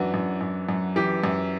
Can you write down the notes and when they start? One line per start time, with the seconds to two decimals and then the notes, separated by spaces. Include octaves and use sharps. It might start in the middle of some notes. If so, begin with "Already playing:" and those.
Already playing: F#2 E3 D4 F#4
0.14 F#2
0.41 F#2
0.69 F#2
0.96 E3 G4
1.24 F#2